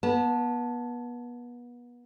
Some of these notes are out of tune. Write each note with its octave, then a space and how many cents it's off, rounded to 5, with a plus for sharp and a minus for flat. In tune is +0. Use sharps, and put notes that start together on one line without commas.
B3 -30 A5 +0